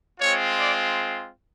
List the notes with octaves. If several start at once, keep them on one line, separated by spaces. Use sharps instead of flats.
G#3 C4 F4 C#5
D5